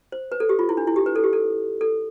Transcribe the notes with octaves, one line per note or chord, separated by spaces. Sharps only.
C5
B4
A4
G4
F4
E4
D4
E4
G4
B4
A4
G4
A4
A4